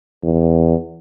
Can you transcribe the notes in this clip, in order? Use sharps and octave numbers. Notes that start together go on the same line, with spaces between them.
E2